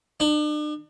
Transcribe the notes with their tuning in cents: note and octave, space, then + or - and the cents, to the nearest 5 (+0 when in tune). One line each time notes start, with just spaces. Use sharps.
D4 +40